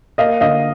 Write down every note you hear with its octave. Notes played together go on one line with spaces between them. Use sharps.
A#3 D#5 F5
D3 D#5 F5